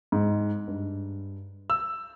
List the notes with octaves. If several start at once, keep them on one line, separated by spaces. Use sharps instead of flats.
G#2
G2
E6